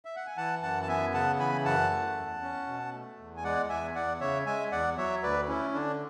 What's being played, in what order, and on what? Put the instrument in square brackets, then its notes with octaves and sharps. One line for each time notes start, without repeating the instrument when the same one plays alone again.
[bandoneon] E5
F#5
G#5
E3 F#5 A5
F#2 F#5 A5
A5
B3 E5 G#5
C#3 F#5 A5
E3 G#5 B5
F#2 F#5 A5
A3
E2
C#4
B2
A3
E2
G#5
G#3 D5 F#5
E2 E5 G#5
E2 D5 F#5
C#3 C#5 E5
G#3 E5 G#5
E2 D5 F#5
F#3 C#5 E5
D2 B4 D5
C#4 E4
D3 D4